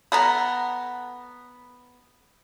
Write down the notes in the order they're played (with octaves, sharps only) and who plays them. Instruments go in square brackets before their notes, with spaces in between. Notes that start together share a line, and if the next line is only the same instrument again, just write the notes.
[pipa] B3 A4 A#5